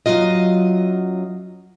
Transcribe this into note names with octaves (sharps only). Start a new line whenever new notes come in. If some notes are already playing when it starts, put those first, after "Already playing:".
F#2 D#3 F#3 F4 D#5